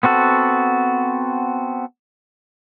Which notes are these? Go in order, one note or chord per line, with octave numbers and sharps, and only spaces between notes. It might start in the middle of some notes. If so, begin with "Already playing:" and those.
B3 C4 F#4 A4